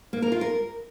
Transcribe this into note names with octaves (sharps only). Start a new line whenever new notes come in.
A#3
A#4
F4
A#4